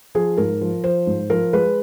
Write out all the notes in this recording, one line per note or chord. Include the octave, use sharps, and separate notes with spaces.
F3 G#4
G#2 A#4
F3
F3 C5
G#2
F3 A#4
G#3 B4